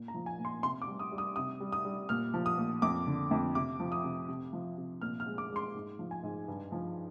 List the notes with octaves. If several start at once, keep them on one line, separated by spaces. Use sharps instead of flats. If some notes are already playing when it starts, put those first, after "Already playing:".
Already playing: A#2
A#5
F3
G#5
A#2
C6
C3 C6
D6
G3
D#6
G3
D#6
C3 D#6
G3
D#6
G3
A#2 F6
F3
D#6
A#2
F2 D6
D3
F2
C3 D6
F3
D#6
C3
C3
F3
C3
A#2 F6
F6
G#3
D6
G#3
C6
G#2
F3
G#5
G#2
G2
F3